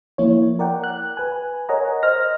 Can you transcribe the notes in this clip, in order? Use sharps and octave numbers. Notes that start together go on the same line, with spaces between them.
F3 A#3 E4 C#5
A#4 D5 F#5 G5
F#6
B4 G#5
A#4 C#5 D#5 F#5 G#5 A#5
C5 D#5 F6 A#6